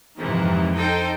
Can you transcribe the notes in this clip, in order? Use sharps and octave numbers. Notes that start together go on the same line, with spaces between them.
F2 G#2 C3 D#3 E3
D#4 A4 C5 G5